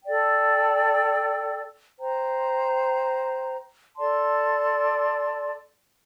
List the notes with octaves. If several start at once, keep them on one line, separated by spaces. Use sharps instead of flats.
A4 D5 G5
C5 G5 A#5
A4 D5 A5 C6